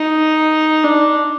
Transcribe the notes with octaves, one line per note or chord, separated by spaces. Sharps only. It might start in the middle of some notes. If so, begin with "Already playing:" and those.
Already playing: D#4
D4